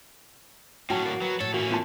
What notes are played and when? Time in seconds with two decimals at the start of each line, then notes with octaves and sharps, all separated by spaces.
0.90 A2 F#3 C#4 F#4 G5 A5
1.06 A#3 A6
1.22 F#3 B3
1.40 A2 A4 C#5
1.54 E3 A#3 C#4 F#4
1.71 B3 F4 A5